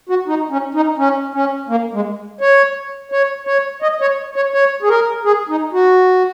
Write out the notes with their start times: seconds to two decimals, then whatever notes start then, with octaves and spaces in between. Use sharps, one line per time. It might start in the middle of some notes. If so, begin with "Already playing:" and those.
0.09 F#4
0.28 D#4
0.51 C#4
0.74 D#4
0.98 C#4
1.34 C#4
1.69 A#3
1.94 G#3
2.41 C#5
3.12 C#5
3.47 C#5
3.82 D#5
4.01 C#5
4.36 C#5
4.54 C#5
4.82 G#4
4.89 A#4
5.25 G#4
5.49 D#4
5.73 F#4